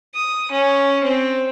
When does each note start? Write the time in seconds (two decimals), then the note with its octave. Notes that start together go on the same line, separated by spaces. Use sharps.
0.15 D#6
0.51 C#4
1.04 C4